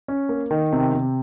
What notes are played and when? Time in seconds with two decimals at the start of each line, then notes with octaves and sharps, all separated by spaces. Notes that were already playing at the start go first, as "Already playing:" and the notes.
0.08 C#4
0.29 A#3
0.51 D#3
0.73 C3
0.94 C3